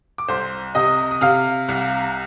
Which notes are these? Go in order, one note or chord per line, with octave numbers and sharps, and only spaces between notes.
D6
C2 C5 C6
C3 D#5 D#6
D#6
C3 F5 F6
C2